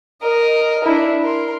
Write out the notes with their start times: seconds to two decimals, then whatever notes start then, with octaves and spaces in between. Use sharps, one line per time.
0.22 A#4 D#5
0.84 D4 E4
1.22 A#4 C6